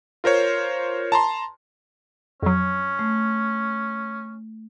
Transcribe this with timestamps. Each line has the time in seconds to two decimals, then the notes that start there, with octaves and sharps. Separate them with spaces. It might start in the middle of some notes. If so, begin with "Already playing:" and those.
0.24 F4 A#4 C5 C#5
1.12 A5 A#5 C6
2.43 F2 F#3 C#4
2.99 A3